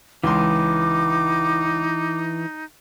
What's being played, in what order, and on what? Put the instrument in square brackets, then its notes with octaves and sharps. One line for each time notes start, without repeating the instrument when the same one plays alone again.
[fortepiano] C#2 C6 [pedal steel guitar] E3 [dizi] D#4 [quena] D6